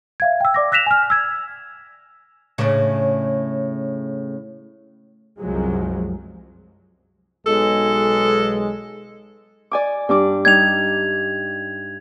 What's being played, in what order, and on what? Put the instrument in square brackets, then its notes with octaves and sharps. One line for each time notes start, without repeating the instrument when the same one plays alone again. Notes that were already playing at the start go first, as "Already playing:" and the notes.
[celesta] E5 F5 G#6
G5 E6
D5 D6 A#6
E6 F#6 A#6 B6 E7 F7
G#5 F6
E6 G#6
[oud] A2 C#3 D4
[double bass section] C2 F#2 F3 F#3 G#3
[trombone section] B1 G#3 [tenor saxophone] A4
[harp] D5 G#5 D6
G2 D4 D6
[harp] G3 D#4 [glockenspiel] G#6 F7